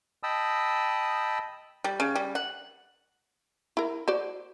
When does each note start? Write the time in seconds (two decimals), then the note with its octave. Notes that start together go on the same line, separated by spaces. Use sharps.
0.23 D#5 G5 A5 B5 D#6 E6
1.84 G3
2.00 C#3
2.15 G3
2.35 F#5
3.77 E4 A#4
4.08 F#4 C5 D5